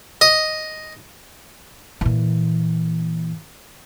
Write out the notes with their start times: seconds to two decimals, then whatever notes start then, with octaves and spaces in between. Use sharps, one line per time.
0.21 D#5
2.01 A#2 E3